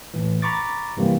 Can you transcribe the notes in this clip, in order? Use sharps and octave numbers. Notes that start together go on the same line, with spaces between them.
A2 E3
A#5 B5 C#6 D6 A6
G2 C3 E3 G3 A#3 C4